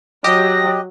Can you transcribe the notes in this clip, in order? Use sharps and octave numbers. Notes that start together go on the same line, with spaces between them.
F#3 G4 D#5 A#6